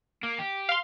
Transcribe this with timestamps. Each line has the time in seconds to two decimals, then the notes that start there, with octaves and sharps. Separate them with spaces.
0.23 A#3
0.39 G4
0.69 F5 C6